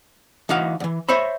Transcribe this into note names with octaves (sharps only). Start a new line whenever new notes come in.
E3 D#4 F#4 F5
D2 E3
C5 C#5 E5 B5